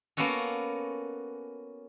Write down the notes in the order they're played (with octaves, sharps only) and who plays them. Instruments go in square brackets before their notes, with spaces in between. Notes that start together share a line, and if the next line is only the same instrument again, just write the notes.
[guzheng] A#3 B3 C#4 F#4 A4